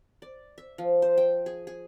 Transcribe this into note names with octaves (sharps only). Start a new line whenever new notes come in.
D5
E5
F3
C5
G5
G#4
G#4